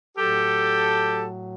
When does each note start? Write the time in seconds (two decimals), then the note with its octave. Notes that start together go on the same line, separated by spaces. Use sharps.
0.18 A2 F#3 G4 A4